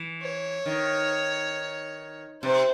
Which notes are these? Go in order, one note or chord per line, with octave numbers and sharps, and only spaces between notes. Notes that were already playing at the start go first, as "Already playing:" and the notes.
Already playing: E3
C#5
D#3
C3 C5